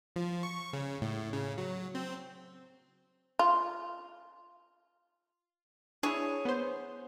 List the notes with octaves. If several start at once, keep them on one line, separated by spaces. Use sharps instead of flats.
F3
C#6
C#3
A2
C#3
F#3
C4
F4
D4 E4 G#4 C#5
B3 C5